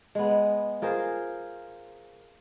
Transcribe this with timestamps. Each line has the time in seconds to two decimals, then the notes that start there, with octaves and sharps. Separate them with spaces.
0.15 G#3 B3
0.82 F4 G#4 A#4 C5